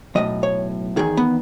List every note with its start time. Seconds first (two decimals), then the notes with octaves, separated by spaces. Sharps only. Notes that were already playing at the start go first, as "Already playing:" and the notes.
0.15 B1 A2 E3 D#5
0.43 C#5
0.97 E2 D#3 G#4
1.17 B3